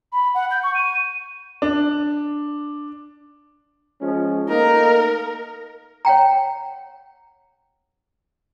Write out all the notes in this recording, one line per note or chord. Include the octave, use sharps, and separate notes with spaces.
B5
F#5
G6
C#6
D#7
D4
F3 G#3 C#4
A3 A#3 D#4 A#4
C#5 F#5 G5 A#5